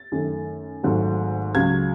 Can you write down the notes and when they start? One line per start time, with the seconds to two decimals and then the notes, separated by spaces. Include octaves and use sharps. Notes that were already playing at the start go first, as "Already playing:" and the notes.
Already playing: A6
0.12 F#2 D#3 A3
0.83 G#1 G#2 F#3 A3
1.55 C#2 C#3 F#3 G#6